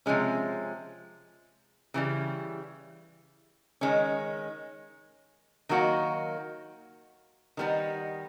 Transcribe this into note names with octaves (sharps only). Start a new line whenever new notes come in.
C3 F3 G#3 C#4
C#3 E3 G3
D#3 G#3 C#4
D#3 F#3 A#3 D#4 F#4
D#3 G3 B3 D#4